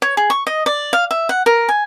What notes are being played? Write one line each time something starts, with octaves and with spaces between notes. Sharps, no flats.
C#5
G#4
C#6
D#5
D5
F5
E5
F#5
A#4
G#5